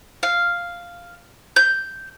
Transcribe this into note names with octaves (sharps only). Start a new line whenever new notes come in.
F5
G6